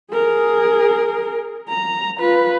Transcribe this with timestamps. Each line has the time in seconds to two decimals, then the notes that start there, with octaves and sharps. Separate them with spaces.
0.13 G#4 A#4
1.69 A#5
2.19 F4 B4